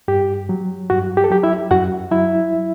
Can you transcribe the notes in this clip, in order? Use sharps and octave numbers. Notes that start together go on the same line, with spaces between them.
G2 G4
F#3
G2 F#4
G4
A4
F#3 G4
E4 E5
F#2 F#4 F#5
F#3 E4 E5